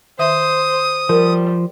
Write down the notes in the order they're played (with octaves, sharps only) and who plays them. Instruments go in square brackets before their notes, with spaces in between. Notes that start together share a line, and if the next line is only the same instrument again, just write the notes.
[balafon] D#3 E5 [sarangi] C5 [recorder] D#6
[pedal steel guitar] F3 [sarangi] G3 [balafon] A#4